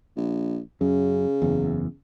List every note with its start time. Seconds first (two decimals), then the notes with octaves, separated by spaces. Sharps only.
0.17 A#1
0.81 F#2 C#3
1.42 F#1 E2